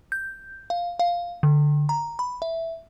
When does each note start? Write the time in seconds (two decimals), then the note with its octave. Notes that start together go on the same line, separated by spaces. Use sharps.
0.12 G6
0.70 F5
0.99 F5
1.43 D3
1.89 A#5
2.19 B5
2.42 E5